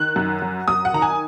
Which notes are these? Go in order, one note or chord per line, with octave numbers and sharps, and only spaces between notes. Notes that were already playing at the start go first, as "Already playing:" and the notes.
Already playing: D#3 F#6
F#2
F#3
F#2 D#6
F#5
D#3 A#5
G#5